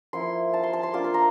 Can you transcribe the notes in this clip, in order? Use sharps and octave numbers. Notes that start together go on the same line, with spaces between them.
F3 A#3 E4 C6
A5
C6
A5
C6
A#3 D4 F4 D6
C6
A#5